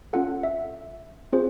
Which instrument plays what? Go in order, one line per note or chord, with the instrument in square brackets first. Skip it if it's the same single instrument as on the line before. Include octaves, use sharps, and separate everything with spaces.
[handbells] C#4 F4 A4 F#5
E5
C4 F4 G#4 C5